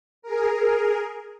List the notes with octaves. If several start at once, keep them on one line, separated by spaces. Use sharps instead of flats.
G#4 A#4